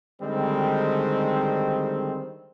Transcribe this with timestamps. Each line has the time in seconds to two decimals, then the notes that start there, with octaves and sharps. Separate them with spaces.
0.22 D3 D#3 G3 G#3 C4